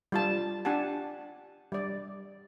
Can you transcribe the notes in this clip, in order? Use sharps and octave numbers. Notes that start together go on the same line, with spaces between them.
G3 F4 A5
D4 G4 F#5 G#5 A5
G3 D5